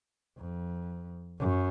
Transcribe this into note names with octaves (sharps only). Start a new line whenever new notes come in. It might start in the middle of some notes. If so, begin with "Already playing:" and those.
F2
F#2